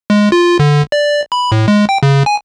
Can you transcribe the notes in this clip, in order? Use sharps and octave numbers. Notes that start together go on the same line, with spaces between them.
G#3
F4
D3
D5
B5
A2
G#3
G5
C#3
G#5